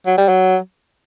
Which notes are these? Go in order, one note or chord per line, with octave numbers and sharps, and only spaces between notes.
F#3
G3
F#3